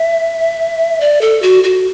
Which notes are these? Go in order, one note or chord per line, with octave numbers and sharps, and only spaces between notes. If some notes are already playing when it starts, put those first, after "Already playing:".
Already playing: E5
D5
A4
F#4
F#4